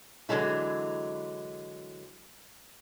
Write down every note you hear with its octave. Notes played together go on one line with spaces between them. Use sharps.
D3 E3 F#3 G#3 E4